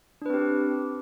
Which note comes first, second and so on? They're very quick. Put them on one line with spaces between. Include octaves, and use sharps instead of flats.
D4 B4 C4 G4